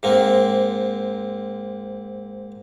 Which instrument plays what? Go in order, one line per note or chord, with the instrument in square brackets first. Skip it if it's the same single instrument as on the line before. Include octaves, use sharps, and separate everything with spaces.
[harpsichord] G#2 A#3 C4